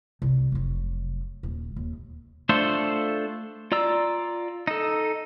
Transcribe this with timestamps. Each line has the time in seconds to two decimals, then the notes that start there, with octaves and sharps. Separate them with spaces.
0.22 C2
0.52 F1 F#3
1.43 D#1
1.76 D#2
2.49 A3 D4 F4 A4 C5
3.72 F4 D5 A#5 E6
4.67 D#4 A4